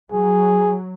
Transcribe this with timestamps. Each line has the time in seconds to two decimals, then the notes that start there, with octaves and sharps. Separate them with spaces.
0.12 F#3 G#4